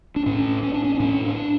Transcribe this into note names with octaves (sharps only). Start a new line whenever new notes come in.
D4
A2 C#4
C#4
D4
C#4
D4
A2 C#4
D4